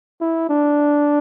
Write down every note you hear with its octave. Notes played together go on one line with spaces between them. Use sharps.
E4
D4